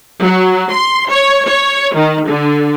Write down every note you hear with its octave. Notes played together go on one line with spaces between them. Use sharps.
F#3
C6
C#5
C#5
D#3
D3